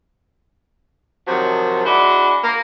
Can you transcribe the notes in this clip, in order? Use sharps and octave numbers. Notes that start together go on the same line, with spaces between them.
C3 D#3 F3 F#3
G#3 D4 E4 F#4
A#3